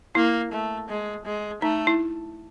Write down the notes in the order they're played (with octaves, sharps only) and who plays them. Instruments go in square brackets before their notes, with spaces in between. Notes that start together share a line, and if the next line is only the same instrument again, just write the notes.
[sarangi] A#3 [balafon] E4
[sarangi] A3
G#3
G#3
[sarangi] A3 [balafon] D#4
[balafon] E4